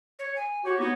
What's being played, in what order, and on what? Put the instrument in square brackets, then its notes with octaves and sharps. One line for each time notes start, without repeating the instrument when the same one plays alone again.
[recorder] C#5
G#5
[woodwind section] F#4 G4 [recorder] C#5
[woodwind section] B3 D#4 [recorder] C#5